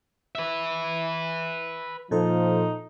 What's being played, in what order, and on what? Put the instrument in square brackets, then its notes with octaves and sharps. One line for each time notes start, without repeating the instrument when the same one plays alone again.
[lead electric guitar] B4 E5
[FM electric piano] A#2 A4 C5 [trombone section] F3 [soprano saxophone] D#4